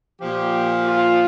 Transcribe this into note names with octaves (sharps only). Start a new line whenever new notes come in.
A#2 F3 G4
F4